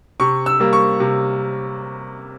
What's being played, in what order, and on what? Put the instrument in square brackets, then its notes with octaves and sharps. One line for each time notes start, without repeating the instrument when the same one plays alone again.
[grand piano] C3 C#6
E6
G3 A#3
C#6
C3